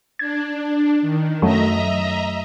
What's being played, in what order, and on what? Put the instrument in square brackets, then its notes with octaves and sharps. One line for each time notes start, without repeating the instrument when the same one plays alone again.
[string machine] D4 [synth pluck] G#6
[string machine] D#3
[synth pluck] F#2 F#3 A3 [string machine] D#5 E5 A#5